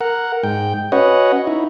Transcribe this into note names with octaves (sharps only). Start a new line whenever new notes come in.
A#4 F#5
G#2 G5
C#4 F#4 B4 C#5 D#5 F#5
D#4 E4